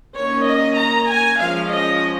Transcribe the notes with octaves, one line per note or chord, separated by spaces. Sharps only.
D#3 A#3 C#4 C#5
D#5
A#5
G#5
F3 G#3 C#4 F5
D#5